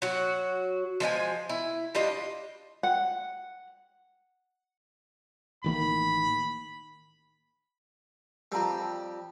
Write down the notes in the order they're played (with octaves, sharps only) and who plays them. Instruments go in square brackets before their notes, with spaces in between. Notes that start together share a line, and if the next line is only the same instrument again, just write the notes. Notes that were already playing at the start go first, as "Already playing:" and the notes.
[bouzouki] F#3 F#4
F3 G#3 D4 G#5
E4
G3 D4 F4 D#5
[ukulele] F#5
[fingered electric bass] A1 D#3 A#3 [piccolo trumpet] B5
[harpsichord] F2 G3 [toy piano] A#4 A5 A#5